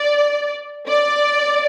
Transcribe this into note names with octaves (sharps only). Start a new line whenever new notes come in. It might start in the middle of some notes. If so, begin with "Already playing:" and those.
Already playing: D5
D5